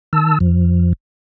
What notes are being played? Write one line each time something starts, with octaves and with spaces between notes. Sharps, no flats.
D#3 A5 E6
F2 F3